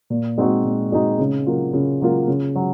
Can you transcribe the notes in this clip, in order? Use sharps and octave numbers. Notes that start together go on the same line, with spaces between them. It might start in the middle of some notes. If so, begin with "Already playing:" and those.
A#2
G#3 C4 D#4 F#4
A#2
G#3 C4 D#4 F#4
C#3
F#3 A#3 F4
C#3
F#3 A#3 F4
C#3
F#3